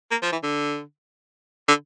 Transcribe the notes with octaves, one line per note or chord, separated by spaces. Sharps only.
A#3
F3
E3
D3
D3